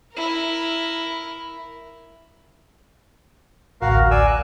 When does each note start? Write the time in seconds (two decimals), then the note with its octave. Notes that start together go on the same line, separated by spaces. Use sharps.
0.13 E4 A#4
3.81 A1 D2 F#4 A#4 F5
4.11 D5 G#5 E6
4.27 F#6